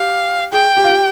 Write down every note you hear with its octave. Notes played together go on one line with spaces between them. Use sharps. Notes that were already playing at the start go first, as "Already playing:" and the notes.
Already playing: G4 F5
G#4 G5
G4
F4
G4